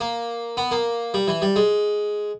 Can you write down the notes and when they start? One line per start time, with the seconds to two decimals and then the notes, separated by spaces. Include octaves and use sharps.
0.01 A#3
0.57 B3
0.71 A#3
1.14 G3
1.28 E3
1.42 G3
1.56 G#3